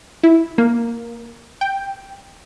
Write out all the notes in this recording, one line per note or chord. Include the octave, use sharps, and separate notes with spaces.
E4
A#3
G5